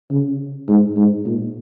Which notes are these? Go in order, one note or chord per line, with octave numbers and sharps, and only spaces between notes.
C#3
G#2
G#2
A#2